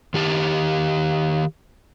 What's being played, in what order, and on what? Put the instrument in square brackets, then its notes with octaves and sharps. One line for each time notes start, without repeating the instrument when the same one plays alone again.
[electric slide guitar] D#3 G4 A5